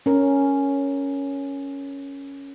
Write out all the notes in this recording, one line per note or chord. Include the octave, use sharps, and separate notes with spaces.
C#4 A#4